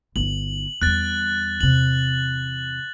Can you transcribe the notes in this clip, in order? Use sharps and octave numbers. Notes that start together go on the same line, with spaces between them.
G1 D#4 F#7
E2 G3 F#6 A6
E2 C3 F#7